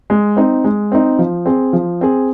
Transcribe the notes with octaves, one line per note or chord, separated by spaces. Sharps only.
G#3
C4 D#4
G#3
C4 D#4
F3
C4 G#4
F3
C4 G#4